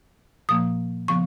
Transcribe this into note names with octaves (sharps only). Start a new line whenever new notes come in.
A#2 F3 A#3 D#6
C#3 F3 B3 C#6